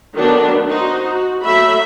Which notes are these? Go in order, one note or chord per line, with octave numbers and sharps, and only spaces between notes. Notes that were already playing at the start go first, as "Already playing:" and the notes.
D#3 F#3 A3 B3 D4
D#4 F#4 C5
F#4
F#3 A3 E5 B5